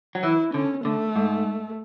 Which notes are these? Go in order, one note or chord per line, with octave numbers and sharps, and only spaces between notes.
F#3
E3 E4
D3 C#4
D3 A3
G#2